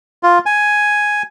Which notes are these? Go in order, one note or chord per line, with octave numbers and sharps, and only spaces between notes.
F4
G#5